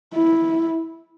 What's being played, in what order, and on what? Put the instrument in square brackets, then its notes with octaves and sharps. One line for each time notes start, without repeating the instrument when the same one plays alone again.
[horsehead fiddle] E4